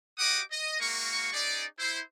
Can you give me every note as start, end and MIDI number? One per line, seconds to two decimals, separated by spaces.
0.19 0.41 66
0.19 0.41 67
0.19 0.41 75
0.19 0.41 78
0.19 0.41 86
0.19 0.41 87
0.51 0.78 75
0.80 1.30 56
0.80 1.30 58
0.80 1.30 66
0.80 1.30 70
0.80 1.30 85
1.33 1.65 61
1.33 1.65 63
1.33 1.65 68
1.33 1.65 74
1.79 2.00 64
1.79 2.00 72